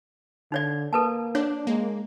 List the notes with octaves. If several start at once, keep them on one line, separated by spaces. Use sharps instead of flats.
D3 D#4 C#5 D5
A#3 A4 B4 A5
D4 C#5
G#3 A#3